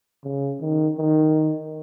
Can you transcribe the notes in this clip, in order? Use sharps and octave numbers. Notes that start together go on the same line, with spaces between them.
C#3
D#3
D#3